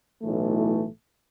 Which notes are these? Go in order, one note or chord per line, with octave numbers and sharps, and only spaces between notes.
B1 A2 E3 A3